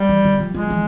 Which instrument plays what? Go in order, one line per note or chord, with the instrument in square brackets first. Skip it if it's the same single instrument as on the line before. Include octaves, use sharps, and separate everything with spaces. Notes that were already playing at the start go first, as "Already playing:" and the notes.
Already playing: [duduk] G3
[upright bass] E3
D#3
F3
[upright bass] F3 [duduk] G#3
[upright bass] E3